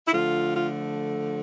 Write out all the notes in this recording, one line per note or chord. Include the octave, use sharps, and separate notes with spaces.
E4
D3 F3 A3 F4
F4